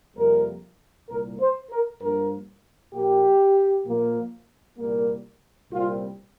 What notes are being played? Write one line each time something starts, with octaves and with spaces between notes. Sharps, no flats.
F2 C3 G3 A#3 A#4
C2 A#2 A#3 A#4
C5
A#4
G2 F3 A#3 A#4
A#2 F3 A#3 G4
A#2 F3 A#3
C2 A#2 G3 A#3
C2 A#2 G3 C4 F4